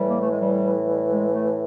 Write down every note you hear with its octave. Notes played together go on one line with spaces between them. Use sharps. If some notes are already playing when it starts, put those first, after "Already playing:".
Already playing: A2 E3 G3
A#3
A3
G#3
G3
G3
G#3
A3